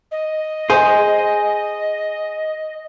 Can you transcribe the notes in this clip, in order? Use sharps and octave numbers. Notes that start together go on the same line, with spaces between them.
D#5
G#4 C5